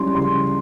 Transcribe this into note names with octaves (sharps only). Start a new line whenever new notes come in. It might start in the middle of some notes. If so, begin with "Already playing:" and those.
Already playing: G3 C#4 E4 C6
C#3 C6